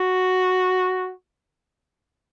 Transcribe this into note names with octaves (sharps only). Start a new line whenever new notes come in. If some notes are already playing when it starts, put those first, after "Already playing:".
Already playing: F#4